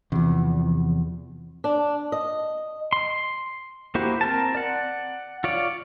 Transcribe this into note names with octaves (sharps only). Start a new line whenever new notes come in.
E2 C3 F3
D4
D#5
C6
A#3 E4 F#4 G4 C5
C4 A#4 A5
D5 F#5
F4 C#5 D5